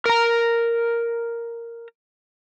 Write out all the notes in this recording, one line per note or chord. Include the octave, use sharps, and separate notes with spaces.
A#4 A#5